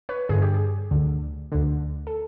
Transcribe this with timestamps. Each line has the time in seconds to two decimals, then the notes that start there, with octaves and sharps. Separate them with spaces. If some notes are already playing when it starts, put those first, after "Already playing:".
0.09 B4 C#5
0.29 G2 D3 G#4
0.42 G4
0.54 G#4
0.91 D2 D3
1.52 D2 D3
2.07 A4